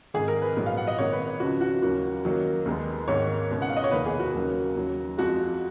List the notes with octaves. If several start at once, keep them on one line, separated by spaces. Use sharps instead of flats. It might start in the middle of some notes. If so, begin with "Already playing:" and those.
G#1 G#2 D#3 G#4
A#4
B4
A#1 G#2 F#3 B3
F5
F#5
D#5
G#1 G#2 D#3 A#3 C#5
B4
B4
C#2 C#3 F3 F#4
F#4
D#2 C#3 F#3 A#3 F#4
F#2 D#3 F#3 A#3
D#2 D#3 G#3 B3
G#1 G#2 D#3 A#3 C#5
C#2 B2 G#3 B3
F#5
F5
D#5
C#5
F1 D#2 D#3 A#3 B4
G#4
F#4
D#2 C#3 F#3 A#3
D#2 C#3 F#3
F2 F3 G#3 F#4